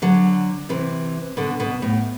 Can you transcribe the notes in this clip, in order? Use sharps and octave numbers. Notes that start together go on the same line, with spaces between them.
D3 F#3
C3 E3
B2 D3
B2
A2